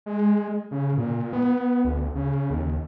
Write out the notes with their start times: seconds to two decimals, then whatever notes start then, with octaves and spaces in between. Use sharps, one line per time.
0.06 G#3
0.71 C#3
0.97 A#2
1.33 B3
1.84 D2
2.15 C#3
2.50 D#2